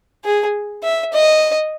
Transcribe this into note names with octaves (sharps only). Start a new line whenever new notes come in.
G#4
E5
D#5